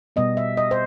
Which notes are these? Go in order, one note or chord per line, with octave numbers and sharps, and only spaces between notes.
B2 G3 B3 D#5
E5
D#5
C5